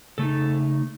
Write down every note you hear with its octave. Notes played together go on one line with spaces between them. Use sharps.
C#3 A3 D#4 A4